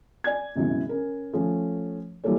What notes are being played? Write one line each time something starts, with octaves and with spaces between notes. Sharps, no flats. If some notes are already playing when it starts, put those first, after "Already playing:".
D5 G#5 G#6
G#1 C#2 F#2 B2 E3
C#4 A#4
F3 A3 C#4
E3 F#3 G3 A#3 A4 C#5